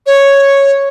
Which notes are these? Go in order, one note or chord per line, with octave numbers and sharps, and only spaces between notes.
C#5